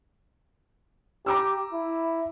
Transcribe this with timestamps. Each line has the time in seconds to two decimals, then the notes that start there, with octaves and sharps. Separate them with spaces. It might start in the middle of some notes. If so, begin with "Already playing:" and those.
1.26 G4 A#5 D6 E6
1.73 E4